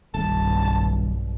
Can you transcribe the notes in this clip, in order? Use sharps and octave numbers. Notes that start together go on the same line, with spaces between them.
D#1 B1 G2 A5